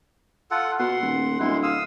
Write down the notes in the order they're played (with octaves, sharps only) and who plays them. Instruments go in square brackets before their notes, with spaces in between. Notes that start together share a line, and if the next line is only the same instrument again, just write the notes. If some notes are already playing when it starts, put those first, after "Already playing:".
[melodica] F4 A4 F#5
[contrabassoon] B2 [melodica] F#5 C6
[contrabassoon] D#1
[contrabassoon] D1 [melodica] G#3 E4 C6
[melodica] F5 D#6 E6